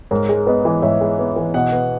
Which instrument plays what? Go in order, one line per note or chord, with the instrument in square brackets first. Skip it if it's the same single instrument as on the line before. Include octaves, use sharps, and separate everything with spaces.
[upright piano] G#2 [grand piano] A#4 C#5
[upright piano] G#3
[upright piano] B3 [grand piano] B4 D#5
[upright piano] E3
[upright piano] G#2 [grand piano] C#5 E5
[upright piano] G#3
B3
E3
[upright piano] B2 [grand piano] D#5 F#5
[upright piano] B3